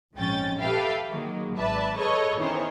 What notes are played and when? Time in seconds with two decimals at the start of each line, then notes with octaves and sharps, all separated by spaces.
0.14 A#1 F2 G#2 C#4 G5 A6
0.59 G4 A4 B4 E5 F5 G5
1.09 D#3 F#3 G#3 A#3
1.56 G#1 B4 D5 E5 A5
1.97 G#4 A4 B4 C#5 D#5 C#6
2.39 D#3 E3 B3 C#4 C5 C#5